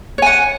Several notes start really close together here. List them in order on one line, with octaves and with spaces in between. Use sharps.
C#5 G#5 F#5